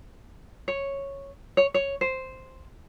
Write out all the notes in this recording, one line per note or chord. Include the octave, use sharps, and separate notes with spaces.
C#5
C#5
C#5
C5